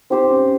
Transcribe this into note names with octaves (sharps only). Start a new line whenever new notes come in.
C4 D#4 G4 C5
C#4